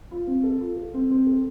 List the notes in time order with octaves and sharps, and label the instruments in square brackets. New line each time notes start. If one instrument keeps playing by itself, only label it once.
[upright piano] F4
C4
A4
F4
A4
C4
C4
A4